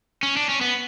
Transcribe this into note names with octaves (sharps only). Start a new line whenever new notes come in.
C#4
D4
C#4
B3